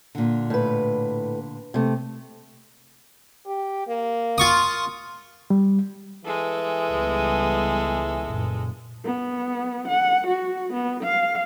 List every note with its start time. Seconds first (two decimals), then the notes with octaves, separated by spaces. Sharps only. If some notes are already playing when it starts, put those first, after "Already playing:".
0.15 A#2 D3
0.50 A2 B4
1.74 C3 A3
3.46 G4
3.87 A#3
4.38 F4 C#6 D#6
5.50 G3
6.25 E3 G#3 A4
6.89 C#2 G3 B3
8.22 F#1 A#2
9.05 B3
9.88 F#5
10.27 F#4
10.73 B3
11.03 F5